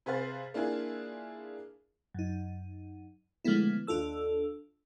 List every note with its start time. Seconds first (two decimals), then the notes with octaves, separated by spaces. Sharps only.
0.06 C3 G#4 B4 C5 F5 A6
0.54 A#3 D4 E4 F4 G#4
2.14 F#2 D#4
3.44 D3 F3 G#3 A3 B3 E4
3.87 D#2 D4 F4 A4 E6